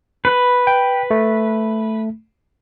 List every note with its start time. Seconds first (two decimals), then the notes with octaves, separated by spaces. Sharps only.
0.25 B4
0.67 G5
1.11 A3